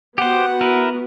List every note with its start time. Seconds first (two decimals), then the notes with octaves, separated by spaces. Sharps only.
0.18 B3 F#4 G4 C5 F#5
0.61 E4 A#4 B4